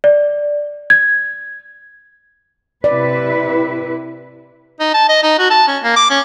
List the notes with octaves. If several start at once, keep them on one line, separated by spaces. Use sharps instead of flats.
D5
G#6
C3 E4 B4 D5
D#4
A5
D#5
D#4
F#4
A5
C#4
A#3
D6
C#4